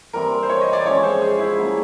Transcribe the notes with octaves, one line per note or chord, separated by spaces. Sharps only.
E3 G3 C4 A#4
C5
C#5
D#5
D5
F3 G#3 C#4 C#5
C5
G#4
E4
G3 A#3 C#4 F#4